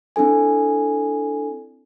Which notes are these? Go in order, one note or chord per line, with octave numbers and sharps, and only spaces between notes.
C4 D4 E4 A4 G#5